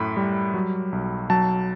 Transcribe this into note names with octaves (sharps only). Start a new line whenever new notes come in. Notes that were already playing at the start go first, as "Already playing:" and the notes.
Already playing: F#2 A2 B5
G3
F#3
B1
F#3 A5